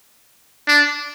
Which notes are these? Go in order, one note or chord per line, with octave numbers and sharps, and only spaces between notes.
D4